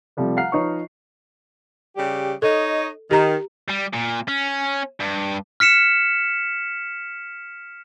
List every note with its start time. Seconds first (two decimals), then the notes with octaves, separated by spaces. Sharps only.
0.17 C3 F3 G3 A3
0.37 F5 F#5 A#5 F6 C7
0.52 F3 D#4 B4 C#5 C#6
1.97 C#3 G3 G4
2.42 D#4 A4 C#5 D#5
3.11 D#3 G4 A#5
3.68 G3
3.93 A#2
4.28 C#4
5.00 G2
5.60 F6 B6 C#7 E7